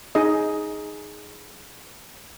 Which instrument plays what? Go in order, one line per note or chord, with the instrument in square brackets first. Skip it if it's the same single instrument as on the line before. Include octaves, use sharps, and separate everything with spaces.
[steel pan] D#4 G#4 D#5